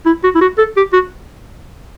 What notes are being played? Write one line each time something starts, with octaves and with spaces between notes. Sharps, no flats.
E4
F#4
E4
F#4
A4
G4
F#4